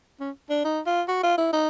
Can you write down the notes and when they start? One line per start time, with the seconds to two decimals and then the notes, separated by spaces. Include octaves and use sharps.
0.20 C#4
0.50 D4
0.65 D#4
0.86 F4
1.08 F#4
1.23 F4
1.38 E4
1.53 D#4